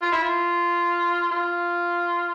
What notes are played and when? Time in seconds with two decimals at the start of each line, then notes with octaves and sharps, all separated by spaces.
0.02 F4
0.12 E4
0.22 F4
1.31 F4